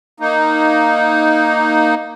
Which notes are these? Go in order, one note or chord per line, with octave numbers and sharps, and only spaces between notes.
A#3 D#4